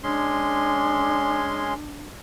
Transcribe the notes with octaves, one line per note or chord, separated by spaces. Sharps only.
G#3 C#4 D4 C6